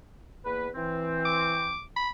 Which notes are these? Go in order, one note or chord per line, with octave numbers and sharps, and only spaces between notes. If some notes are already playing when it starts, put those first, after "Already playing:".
E2 A#3 B4
E3 C4
D6
B5